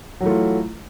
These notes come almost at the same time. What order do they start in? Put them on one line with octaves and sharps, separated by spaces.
F#3 E3 A3 F4